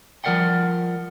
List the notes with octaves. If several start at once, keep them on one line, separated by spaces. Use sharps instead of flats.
F3 G3 A#4 D5 F#5 G5